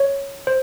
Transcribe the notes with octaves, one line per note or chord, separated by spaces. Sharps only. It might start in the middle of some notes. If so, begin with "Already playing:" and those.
Already playing: C#5
C5